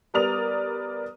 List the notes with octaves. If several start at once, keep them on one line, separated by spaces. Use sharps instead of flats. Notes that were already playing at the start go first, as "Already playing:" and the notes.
G3 B3 A#4 D5 D#6 F7